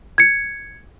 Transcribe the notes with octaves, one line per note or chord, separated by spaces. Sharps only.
G#6 C#7